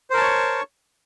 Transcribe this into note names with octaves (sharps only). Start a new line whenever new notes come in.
A#4 C5 C#5 A5 C#6